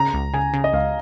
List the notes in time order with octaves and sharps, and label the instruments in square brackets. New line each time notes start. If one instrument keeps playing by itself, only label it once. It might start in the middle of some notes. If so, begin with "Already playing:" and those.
Already playing: [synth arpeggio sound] C#3 [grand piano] A#5
[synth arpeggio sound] C#2
[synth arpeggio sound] C#3 [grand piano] G#5
[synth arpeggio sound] C#3
[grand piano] D#5
[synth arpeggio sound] C#2 [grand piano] F5